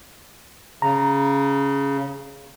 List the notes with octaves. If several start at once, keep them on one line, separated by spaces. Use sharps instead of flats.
C#3 A#5